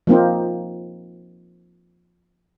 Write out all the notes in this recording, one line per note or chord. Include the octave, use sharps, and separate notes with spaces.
F3 A#3 C4 D#4